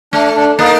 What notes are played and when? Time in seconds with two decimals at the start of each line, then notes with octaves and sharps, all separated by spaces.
0.13 A3 D4
0.36 D4
0.59 A#3 D#4